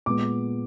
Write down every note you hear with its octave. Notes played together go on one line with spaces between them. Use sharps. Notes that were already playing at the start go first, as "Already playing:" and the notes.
A#2 G#3 B3 D6